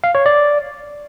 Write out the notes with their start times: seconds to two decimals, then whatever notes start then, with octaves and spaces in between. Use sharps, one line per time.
0.04 F5
0.15 C#5
0.26 D5